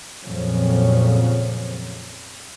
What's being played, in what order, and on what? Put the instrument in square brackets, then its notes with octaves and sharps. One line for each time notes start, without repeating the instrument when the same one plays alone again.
[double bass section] F2 A#2 C#3 F3 F#3